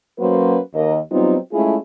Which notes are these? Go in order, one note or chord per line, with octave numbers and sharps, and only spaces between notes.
F#3 A#3 C#4 F#4 B4 C5
D#2 A#4 D#5
F#3 G3 B3 C4 D#4 F4
G#3 A3 C#4 E4 F4 G#4